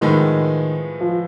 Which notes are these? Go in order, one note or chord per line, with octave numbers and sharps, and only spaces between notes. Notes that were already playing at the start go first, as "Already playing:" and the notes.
A2 D#3 F3 G#3 B3
F3